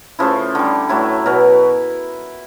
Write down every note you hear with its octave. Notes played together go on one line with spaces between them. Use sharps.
C#3 F3 A3 E4
D3 G3
A2 F#3 A3 E4
B2 F#3 A#4